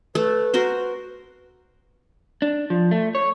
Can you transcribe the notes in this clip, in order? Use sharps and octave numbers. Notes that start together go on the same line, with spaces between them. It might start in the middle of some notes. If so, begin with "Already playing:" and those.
A3 B4
F#4 A#4 C5
D4
F3
A3
C#5